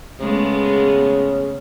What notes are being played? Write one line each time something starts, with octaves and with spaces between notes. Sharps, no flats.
C#3 G#3 A3 B3